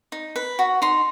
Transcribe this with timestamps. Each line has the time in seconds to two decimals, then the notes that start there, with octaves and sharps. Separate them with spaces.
0.12 D#4
0.36 B4
0.59 F#4
0.82 D#4 C6